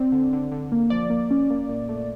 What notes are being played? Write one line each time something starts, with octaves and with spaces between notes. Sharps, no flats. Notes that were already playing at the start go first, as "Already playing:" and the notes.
Already playing: C4 D5
D3
D3
D3
A#3
F3 D5
A#3
C#4
A#3
A#2
A3